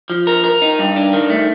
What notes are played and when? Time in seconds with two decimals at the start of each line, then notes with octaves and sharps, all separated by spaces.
0.10 F3
0.27 A#4
0.44 A#4
0.62 D#4
0.79 G2
0.96 D4
1.13 D#3
1.30 A3